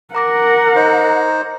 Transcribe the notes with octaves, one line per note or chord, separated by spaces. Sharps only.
A#4 F#5 A#5 D6 A#6
D#4 C5